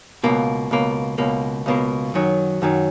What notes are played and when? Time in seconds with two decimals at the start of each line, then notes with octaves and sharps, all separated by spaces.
0.23 C#2 B2 A#3
0.71 C#2 B2 A#3
1.18 C#2 B2 A#3
1.66 C#2 B2 A#3
2.14 F#2 D#3 F#3
2.62 F#2 D#3 F#3